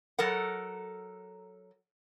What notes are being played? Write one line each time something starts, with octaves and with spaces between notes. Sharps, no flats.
F#3 A4 A#4 F#5